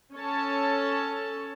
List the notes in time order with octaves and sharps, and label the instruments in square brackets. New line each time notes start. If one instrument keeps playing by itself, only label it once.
[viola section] C#4 A4 C#5 A5